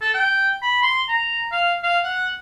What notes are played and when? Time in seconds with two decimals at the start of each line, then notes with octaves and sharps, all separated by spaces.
0.01 A4
0.14 G5
0.62 B5
0.83 C6
1.08 A#5
1.52 F5
1.83 F5
2.03 F#5